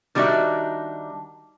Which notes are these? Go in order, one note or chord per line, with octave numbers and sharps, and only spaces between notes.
D#3 G3 D4 D#4 F#4 E5